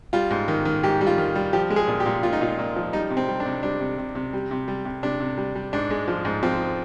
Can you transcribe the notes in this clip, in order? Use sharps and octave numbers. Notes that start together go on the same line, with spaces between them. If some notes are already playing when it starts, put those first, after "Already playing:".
G3 F4
G#2
D#3
D#3
G#2 G4
G3
F4
D#3
G3
F3 G4
G#3
G#4
A#2
G4
A#2
A#2 F4
D#4
A#2 F4
A#2
F3
G3 D#4
C3
C4
G3
D4
C3
G3 D4
C3
C3
C3
G3
C3
G3
C3
C3 D4
C3
G3
G3
G#2 D4
G#3
F3
G#2
F3 C4